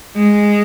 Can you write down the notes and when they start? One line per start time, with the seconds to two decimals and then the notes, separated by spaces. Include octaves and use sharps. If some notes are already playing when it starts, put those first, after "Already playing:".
0.17 G#3